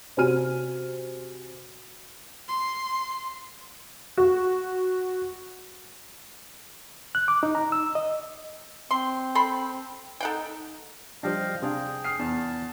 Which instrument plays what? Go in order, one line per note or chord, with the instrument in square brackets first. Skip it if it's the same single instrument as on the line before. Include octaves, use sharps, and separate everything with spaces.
[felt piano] C3 F#4 C5 G#5 F6 D#7
[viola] C6
[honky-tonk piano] F#4
[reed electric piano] F#6
D6
D#4
A#5
E6
D#5
[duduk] C4 [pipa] C6
[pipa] A4 B5 C6
[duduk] D#4 [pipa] A4 F#5 G5
[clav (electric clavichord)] F3 G3 D4 [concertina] D#5 F5 G5
[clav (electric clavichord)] C3 D4 F5 [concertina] G#4 G5
[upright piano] D#6 F6 C7
[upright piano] E2 [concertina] A5